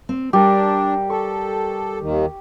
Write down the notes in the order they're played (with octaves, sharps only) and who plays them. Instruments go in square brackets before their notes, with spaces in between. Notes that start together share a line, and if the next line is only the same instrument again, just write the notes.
[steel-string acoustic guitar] C4
[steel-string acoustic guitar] G3 A#4 [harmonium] D4 [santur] G4
[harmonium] A4 [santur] C#6
[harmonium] D#2 D#3